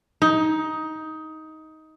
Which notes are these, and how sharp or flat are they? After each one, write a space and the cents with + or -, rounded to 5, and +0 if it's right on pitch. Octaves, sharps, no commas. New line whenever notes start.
D#4 +15